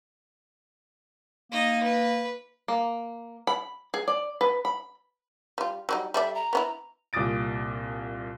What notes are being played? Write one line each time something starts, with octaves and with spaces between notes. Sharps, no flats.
A#3 D#4 D#5
B4
A#3
B5
G#4
D5
B4
B5
G3 F4
F#3 G3 D#4
G3 A4 D5 E5
A#5
B3 C#4 E4
C2 A#2 D6 D#6 A6 D7